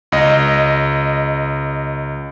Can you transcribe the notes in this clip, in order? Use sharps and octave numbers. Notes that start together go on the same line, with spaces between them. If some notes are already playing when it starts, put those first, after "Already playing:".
C#2 D#5